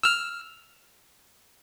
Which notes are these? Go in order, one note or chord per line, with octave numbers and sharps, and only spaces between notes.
E6 F6